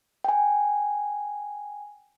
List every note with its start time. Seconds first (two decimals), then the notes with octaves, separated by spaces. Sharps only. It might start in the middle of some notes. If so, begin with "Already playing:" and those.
0.24 G5 G#5